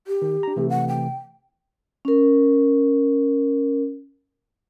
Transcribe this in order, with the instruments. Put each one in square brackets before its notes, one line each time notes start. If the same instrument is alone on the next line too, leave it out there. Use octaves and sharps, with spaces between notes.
[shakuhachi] G4
[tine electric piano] D#3
D4 A#5
C3 E3 A3
[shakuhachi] F#5
G5
[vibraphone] C#4 A#4